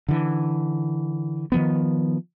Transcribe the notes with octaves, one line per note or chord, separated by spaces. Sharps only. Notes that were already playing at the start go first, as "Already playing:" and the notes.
D3 E3
D#3 F3 B3